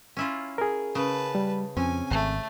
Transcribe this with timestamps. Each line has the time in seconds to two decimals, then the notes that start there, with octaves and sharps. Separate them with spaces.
0.17 C#4 E4 F4
0.58 G#4 A#4
0.95 C#3 B4 A5
1.35 G3
1.77 F2 C4 C#4 G#5
2.11 G#1 A3